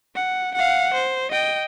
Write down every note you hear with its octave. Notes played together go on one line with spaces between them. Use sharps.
F#5
F5 F#5
C5
D#5 G5